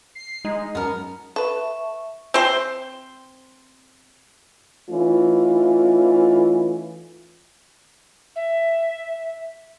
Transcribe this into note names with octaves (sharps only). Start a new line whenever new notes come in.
C7
G#3 D#4
F#2 B3 A#4
A4 B4 E5 A5 C#6
C4 C5
E3 A3 C#4 D#4 F4
E5